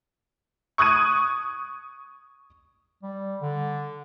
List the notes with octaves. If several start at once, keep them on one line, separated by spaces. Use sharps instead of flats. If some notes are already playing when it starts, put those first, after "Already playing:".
C#6 D#6 F#6 G#6 D#7
G3
D3